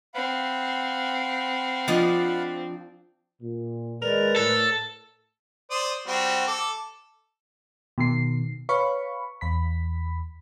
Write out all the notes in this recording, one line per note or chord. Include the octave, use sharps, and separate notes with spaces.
C4 F5 F#5 B5
F3 D4 D#5
A#2
D#2 G#3 A#4 B4 D5
A2 A4
C5 D5 D#6
G3 C4 F#4
A4 D6
B2 D#3 C7
B4 C#5 F5 B5 C#6
E2 B5 B6